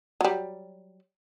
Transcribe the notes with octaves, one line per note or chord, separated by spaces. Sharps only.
F#3 G3